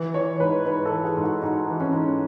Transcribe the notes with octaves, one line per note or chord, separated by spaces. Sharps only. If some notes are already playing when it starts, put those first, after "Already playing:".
Already playing: E3
E3 C#5
G#2 B4
G#2 B4
A4
E3
G#4
G#2
F#4
G#2 D#4
E3
C#4
G#2